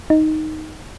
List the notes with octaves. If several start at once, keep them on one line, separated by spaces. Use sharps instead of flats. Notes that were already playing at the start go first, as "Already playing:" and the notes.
D#4